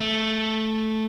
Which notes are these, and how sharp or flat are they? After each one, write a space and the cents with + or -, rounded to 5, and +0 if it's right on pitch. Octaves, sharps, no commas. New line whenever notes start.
A3 -5